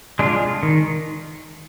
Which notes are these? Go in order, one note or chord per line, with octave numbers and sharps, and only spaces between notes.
G#3 D4 F4
D#3